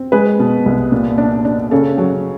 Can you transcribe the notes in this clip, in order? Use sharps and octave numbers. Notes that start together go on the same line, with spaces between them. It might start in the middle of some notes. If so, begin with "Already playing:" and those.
Already playing: C4
G#3 B4
B2
C2
A#2
D4
D4
C#3 A4
F#3